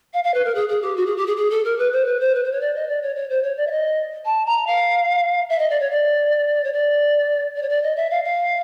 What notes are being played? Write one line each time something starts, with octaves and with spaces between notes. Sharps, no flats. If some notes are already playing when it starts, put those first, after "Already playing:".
F5
F5
B4
A#4
G#4
G#4
G4
F#4
G#4
G4
G#4
G#4
A4
A#4
B4
C5
B4
C5
B4
C5
C#5
D5
D#5
D5
C#5
C#5
C5
C#5
D5
E5
D#5
A5
A#5
F5
E5
D#5
D5
C#5
D5
C#5
D5
D5
C#5
D5
D#5
E5
F5
F5